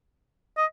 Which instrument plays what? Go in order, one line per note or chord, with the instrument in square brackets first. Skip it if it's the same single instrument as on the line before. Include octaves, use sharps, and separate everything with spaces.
[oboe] D#5